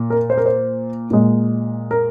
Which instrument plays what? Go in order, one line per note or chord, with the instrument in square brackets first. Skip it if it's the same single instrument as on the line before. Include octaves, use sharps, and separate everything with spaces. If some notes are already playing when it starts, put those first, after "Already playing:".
Already playing: [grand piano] A#2
A#4
C5
A#4
C5
A#2 G#3
A#4